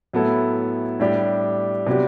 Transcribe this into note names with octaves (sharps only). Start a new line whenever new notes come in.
A2 F#3 B3 E4 A4
A2 G3 D4 G4
C3 F#3 B3 D4 G4